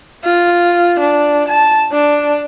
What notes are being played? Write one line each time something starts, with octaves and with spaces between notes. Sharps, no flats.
F4
D4
A5
D4